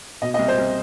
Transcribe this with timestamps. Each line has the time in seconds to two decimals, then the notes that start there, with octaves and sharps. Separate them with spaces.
0.22 B2 D#5
0.34 D#5
0.39 C2
0.48 C5
0.58 C2